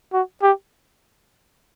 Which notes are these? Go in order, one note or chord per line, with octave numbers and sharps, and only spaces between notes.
F#4
G4